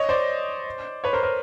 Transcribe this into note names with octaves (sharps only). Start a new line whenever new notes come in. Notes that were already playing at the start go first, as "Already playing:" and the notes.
Already playing: C#5 D#5
C5 D5
B4 C#5
A#4 C5
A#4 C5